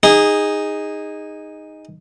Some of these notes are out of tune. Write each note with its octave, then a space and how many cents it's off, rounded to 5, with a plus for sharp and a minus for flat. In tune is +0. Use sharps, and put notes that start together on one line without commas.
D#4 +0 G#4 -20